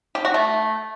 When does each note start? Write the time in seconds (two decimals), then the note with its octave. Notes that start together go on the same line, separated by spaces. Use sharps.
0.15 G4
0.25 F#4
0.34 A3